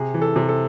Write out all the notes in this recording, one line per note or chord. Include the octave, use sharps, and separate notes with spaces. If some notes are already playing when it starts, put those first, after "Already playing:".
Already playing: C3 G#4
E3
A4
C3
A4